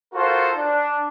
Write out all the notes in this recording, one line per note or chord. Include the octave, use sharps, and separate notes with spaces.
F4 F#4 A4 A#4 C5
D4